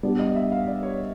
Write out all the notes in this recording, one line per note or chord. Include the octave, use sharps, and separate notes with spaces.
G3 B3 D4 D5
D#5
E5
F5
D5
C#5